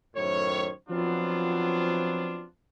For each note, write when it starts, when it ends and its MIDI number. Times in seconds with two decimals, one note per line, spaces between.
0.15 0.70 42
0.15 0.70 45
0.15 0.70 51
0.15 0.70 72
0.15 0.70 73
0.89 2.45 53
0.89 2.45 54
0.89 2.45 59
0.89 2.45 60
0.89 2.45 62
0.89 2.45 65